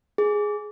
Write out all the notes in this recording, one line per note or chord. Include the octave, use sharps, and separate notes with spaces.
G#4